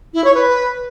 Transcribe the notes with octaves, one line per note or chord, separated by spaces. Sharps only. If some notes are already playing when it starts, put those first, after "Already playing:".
E4
C#5
B4